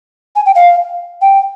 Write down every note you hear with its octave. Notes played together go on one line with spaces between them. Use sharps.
G#5
G5
F5
G5